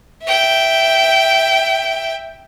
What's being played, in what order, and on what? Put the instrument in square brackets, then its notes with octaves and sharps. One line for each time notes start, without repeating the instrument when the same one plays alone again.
[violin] E5 G5